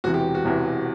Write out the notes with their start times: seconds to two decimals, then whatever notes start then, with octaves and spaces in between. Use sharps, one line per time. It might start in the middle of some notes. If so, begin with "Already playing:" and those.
0.04 E1 E2 C3 E3 F#4
0.14 G4
0.35 F#4
0.44 E1 E2 C3 E3